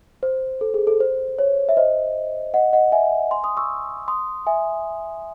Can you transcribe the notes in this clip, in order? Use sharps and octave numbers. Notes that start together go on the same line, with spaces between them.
C5
A4
G#4
A4
C5
C#5
E5
C5 D#5
D#5 F#5
D#5 F#5
E5 G#5
G#5 C6
C6 D#6
C#6 E6
C6 D#6
E5 G#5